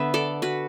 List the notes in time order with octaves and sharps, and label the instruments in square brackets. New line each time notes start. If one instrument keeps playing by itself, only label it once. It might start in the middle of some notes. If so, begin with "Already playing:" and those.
Already playing: [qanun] D3 B3 B4 E5
A4 D5
F#4 B4